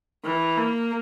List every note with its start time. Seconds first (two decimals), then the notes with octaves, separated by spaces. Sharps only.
0.24 E3
0.57 A#3